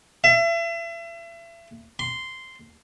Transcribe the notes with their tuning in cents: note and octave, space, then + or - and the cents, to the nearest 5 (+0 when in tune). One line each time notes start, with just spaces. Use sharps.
E5 +35
C6 -5